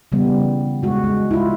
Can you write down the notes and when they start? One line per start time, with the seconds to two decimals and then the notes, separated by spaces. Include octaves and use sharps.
0.12 C#3 E3 G3 B3
0.83 G#3 F#4
1.04 G#3
1.31 E4 F4